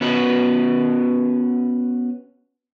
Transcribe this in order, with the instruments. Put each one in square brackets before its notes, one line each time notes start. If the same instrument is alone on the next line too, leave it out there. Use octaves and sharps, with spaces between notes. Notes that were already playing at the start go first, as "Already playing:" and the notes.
[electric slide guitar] B3 C#4 F#4 B4